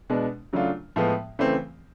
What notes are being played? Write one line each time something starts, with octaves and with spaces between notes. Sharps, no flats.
B2 G#3 B3 D4
C#3 F#3 A3 D4 F4
A2 F3 G#3 B3
C#3 E3 A3 C4